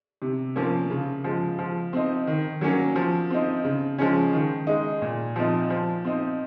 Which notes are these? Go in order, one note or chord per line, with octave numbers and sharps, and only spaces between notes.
C3
F3 A#3 C#4
C#3
F3 G#3
F3
C4 D#4
D#3
F#3 A#3 C#4
F3
C4 D#4
C#3
F3 G#3 C#4
D#3
G#3 D#4
A#2
F3 C4 D#4
F3
C4 D#4